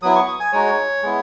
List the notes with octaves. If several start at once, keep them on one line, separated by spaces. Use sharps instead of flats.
F#3 B3 E4 D#6
C#6
D#6
G#5
G#3 D#4 F#4 C#5
G#3 B3 E4